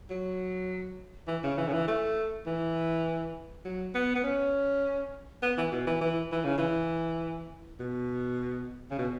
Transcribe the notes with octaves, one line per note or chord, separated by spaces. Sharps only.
F#3
E3
C#3
E3
C#3
E3
A3
E3
F#3
B3
B3
C#4
B3
E3
B2
E3
E3
E3
C#3
E3
B2
C#3
B2